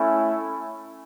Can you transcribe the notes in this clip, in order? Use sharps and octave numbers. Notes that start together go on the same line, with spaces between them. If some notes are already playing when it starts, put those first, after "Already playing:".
Already playing: A3 C#4 E4